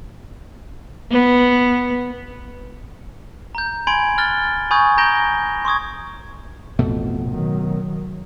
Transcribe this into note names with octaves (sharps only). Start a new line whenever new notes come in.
B3
A#5 G6
G#5 B5 C6 G#6 D7 F#7
F6 F#6 A6 G7
G#5 B5 C#6 D#6 G6 G#6
G#5 A#5 G6 A#6 D7 G7
C6 C#6 D#6 G#6
A1 F2 B2 A3
D#3 F#3